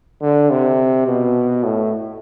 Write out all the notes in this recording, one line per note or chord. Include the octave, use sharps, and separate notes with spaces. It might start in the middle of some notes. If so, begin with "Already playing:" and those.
D3
C3
B2
A2